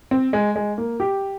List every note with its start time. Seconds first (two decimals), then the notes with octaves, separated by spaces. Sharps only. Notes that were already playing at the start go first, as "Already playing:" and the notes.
0.11 C4
0.33 G#3
0.56 G#3
0.78 A#3
1.00 G4